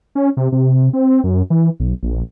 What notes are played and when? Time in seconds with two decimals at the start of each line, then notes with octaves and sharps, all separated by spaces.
0.15 C#4
0.37 C3
0.52 C3
0.93 C4
1.24 F#2
1.50 E3
1.80 B1
2.03 A#1